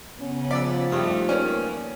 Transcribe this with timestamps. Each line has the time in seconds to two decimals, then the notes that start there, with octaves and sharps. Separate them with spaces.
0.20 C#3 B3 C#4
0.51 F3 D5 E6 A6 B6
0.92 G2 A3 D#4 G5 D#6
1.29 A#3 C#4 A#4 B4 D5